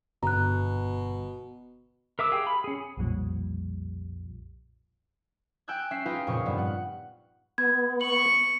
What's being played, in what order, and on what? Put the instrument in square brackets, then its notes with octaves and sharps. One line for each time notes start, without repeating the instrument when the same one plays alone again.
[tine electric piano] G1 [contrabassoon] B2 [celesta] A#5 F#6
[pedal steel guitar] A#4 E5 D6 E6
G4 G#4 F5 G5
B5
C#4 G#4
[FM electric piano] B1 F2 A#2 F3 G3
[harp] G5 G#5 E6 F#6 G#6
C#4 E5 B6 C7
D#4 F4 G#4 B4 F5 G5
F2 A#2 C#3 C#6
G2 B3
F#5
[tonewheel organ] B3 [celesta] G#6
[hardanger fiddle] C#6 [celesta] F#7